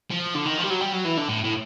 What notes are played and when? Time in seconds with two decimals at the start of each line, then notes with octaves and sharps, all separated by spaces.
0.11 F3
0.35 D3
0.46 D#3
0.58 F3
0.64 G3
0.70 F#3
0.81 G3
0.93 F#3
1.05 E3
1.17 D3
1.29 A2
1.44 A2